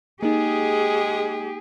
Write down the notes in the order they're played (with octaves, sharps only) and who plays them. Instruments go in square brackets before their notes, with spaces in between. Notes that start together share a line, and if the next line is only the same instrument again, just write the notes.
[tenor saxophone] G#3 [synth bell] A#3 D#4 [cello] G4 [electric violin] G#4